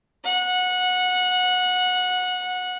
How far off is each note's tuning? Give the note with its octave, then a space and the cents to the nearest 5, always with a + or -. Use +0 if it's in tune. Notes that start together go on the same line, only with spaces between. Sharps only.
F#5 -20